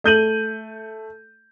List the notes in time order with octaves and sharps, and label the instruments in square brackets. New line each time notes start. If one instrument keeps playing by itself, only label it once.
[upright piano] A3 G6 D#7 F#7